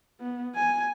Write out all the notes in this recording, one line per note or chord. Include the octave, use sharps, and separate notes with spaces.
B3
G#5